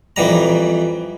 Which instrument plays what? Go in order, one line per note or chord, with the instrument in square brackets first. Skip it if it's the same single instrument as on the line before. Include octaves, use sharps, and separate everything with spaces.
[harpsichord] F2 E3 G3 A#5